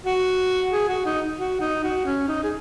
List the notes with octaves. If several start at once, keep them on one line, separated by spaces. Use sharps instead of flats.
F#4
G#4
F#4
D#4
F#4
D#4
F#4
C#4
D#4
G#4